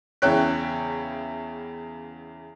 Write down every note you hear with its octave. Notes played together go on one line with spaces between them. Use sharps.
E2 C#3 E4 C#5 G5 F#6